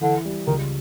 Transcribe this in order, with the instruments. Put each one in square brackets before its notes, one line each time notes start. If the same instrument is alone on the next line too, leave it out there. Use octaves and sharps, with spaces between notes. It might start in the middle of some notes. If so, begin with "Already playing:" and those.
[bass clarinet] D3 [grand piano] E3
[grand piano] G3
[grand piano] C#2 [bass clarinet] D#3